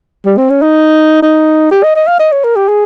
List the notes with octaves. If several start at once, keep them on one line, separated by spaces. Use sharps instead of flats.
G3
C4
C#4
D#4
D#4
G4
D#5
D#5
F5
D#5
C#5
A#4
G4
G#4